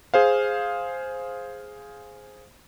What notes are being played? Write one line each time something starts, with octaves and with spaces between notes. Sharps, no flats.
G#4 C5 F5